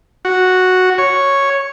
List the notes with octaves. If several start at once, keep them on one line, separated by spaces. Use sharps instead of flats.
F#4
C#5